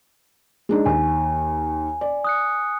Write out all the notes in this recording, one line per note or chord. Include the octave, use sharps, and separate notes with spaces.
G#3 D4 D#4
D#2 G#5
D5
D#6 F#6 C#7